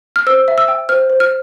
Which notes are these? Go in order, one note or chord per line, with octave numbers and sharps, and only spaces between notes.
F6
C5 E6
E5
E6
G5
C5 F6
C5
F6